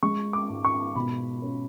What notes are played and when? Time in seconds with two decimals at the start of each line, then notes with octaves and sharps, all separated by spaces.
0.03 G#3 C#6
0.33 D6
0.49 G#2
0.65 C#6
0.95 B2 B5
1.42 C#4